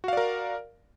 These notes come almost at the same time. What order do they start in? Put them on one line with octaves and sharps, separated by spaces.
F#4 F5 D5 A#4